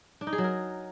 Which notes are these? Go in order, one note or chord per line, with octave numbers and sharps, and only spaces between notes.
D4
D#4
G#4
F#3
A#4